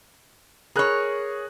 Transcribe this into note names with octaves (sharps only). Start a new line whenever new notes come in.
G#4 A#4 C#5 F#6